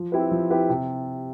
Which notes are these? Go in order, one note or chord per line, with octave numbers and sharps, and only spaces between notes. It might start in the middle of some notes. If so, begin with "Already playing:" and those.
Already playing: F3
C4 E4 G4 B4
F3
C4 E4 G4 B4
C3